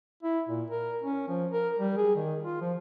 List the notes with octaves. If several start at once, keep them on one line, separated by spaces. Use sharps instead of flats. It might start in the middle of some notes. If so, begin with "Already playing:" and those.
E4
A#2
A#4
C#4
F3
A#4
G3
G#4
D#3
F4
F3